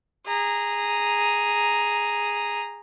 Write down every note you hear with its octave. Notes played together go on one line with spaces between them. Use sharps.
G#4 A#5